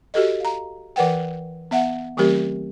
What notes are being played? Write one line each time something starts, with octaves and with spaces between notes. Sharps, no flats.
F#4 G4 A4 D#5
F5 A#5
E3 A#4 B4 F#5 G5
B3 E5 F#5
D#3 F#3 A3 C4 G4 A#4